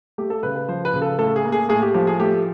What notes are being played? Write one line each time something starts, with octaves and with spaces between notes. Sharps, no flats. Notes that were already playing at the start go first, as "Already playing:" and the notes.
A3 G4
A4
C#3 B4
B4
F3 C5
B4
C#3
A4
A2 A4
G#4
A#3
G#4
A2 G#4
G4
F3 G4
G#4
A3 G4